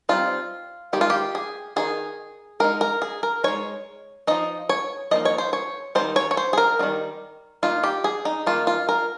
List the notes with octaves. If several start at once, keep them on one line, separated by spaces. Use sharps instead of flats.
G3 C4 D#4 F4
D#3 G#3 D#4 G4
F4
G4
G#4
D#3 G#3 D#4 G#4
G#3 D#4 A#4
A#4
G#4
A#4
G#3 D#4 C#5
F3 A#3 D#4 D#5
C#5
F3 A#3 D#4 D#5
C#5
C5
C#5
D#3 G3 C4 D#4 C5
C#5
C#5
C5
G#4
A#4
D#3 G3 C4 D#4
D#3 A#3 D#4 F4
G4
G#4
D#4
D#3 A#3 D#4 F4
F4
A#4